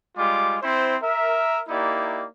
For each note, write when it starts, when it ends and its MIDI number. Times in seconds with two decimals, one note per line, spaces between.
0.17 0.58 55
0.17 0.58 56
0.17 0.58 65
0.17 0.58 86
0.62 0.96 60
0.62 0.96 64
0.62 0.96 72
1.02 1.62 70
1.02 1.62 76
1.69 2.26 58
1.69 2.26 63
1.69 2.26 64
1.69 2.26 67
1.69 2.26 74